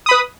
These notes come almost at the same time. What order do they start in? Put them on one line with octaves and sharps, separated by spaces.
D#6 B5 B4